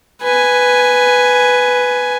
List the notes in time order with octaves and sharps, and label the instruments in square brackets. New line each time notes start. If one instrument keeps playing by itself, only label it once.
[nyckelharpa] B4 G#5